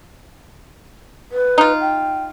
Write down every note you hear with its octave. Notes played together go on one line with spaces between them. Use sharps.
B4
D#4 F4
G5